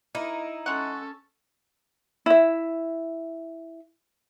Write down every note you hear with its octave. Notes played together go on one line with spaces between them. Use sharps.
A#3 D#4 E4
G#3 C#4 A4 F#5 C#6
E4 E5